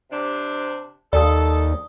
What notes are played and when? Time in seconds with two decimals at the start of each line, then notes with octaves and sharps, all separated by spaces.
0.12 C3 D4
1.13 D#2 A4 D5 D#6